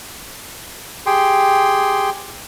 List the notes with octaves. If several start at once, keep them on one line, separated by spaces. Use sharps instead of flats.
G4 G#4 G5 C6